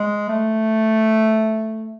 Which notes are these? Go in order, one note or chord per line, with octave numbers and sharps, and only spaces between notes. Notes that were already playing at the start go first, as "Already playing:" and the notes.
Already playing: G#3
A3